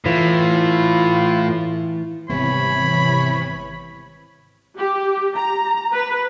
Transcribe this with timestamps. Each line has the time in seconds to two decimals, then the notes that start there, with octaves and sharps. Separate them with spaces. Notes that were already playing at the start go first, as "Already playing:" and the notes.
0.06 A2 E3 F4
2.30 G#1 C3 E3 G3 B3 C#5 B5
4.78 G4
5.35 A#5
5.93 B4